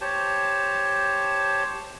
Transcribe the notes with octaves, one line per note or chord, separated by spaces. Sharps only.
G4 C5 C#5 A5